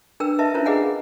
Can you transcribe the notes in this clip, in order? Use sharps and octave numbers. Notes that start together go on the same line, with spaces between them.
D4 A#4 B4 G5 E6
B4 D#5 E5 A5
C#4 D4 E4 F4 A#4 C5
G#4 B4 D#5 F5 F#5 G#5